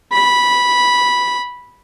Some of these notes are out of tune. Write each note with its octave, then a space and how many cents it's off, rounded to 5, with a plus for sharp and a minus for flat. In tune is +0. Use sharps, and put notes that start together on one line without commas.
B5 -10